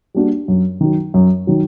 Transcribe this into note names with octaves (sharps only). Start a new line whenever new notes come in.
G3 A#3 D4 F#4
F#2
D#3 F#3
F#2
D#3 F#3